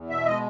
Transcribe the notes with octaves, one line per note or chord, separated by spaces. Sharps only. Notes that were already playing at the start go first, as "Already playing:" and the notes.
Already playing: E2
B2 E5
G#3 D#5